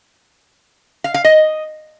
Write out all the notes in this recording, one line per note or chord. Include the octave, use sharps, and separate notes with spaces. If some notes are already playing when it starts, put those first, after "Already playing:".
F5
F5
D#5